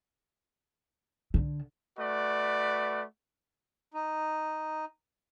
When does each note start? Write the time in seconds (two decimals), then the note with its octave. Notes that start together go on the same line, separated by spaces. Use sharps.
1.34 D3
1.99 A3 F#4 B4 D5
3.94 D#4